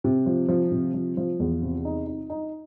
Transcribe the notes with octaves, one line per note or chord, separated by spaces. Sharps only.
C3
F3
F3
C3
F3
F3
E2
C3
D#4
D#4
D#4